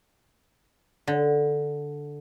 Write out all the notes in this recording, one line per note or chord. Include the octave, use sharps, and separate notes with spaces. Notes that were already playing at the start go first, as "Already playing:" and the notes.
D3